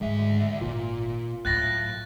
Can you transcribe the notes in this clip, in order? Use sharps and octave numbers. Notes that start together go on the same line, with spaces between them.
D2 G#2 D#3 G#3 E5
G#1 A#2 D#4 F4
D2 A2 F#3 F#6 A6 A#6